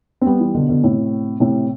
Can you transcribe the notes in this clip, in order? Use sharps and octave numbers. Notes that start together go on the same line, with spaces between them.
C4
G3 B3
E3 G3
B2 D3
B2 D3
A2 C3
A2 C3